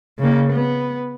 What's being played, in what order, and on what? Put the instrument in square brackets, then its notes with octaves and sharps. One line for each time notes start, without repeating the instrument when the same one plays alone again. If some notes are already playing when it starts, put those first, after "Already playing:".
[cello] C#3 A#3
B3